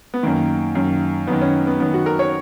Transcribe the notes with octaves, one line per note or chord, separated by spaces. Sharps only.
B3
F#2 D#3 A#3
F#2 D#3
F#2 D#3 B3
C#4
B3
F#2 D#3 B3
F#4
A#4
C#5